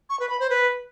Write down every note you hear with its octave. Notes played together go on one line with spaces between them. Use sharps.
C#6
B4
B5
C5
B4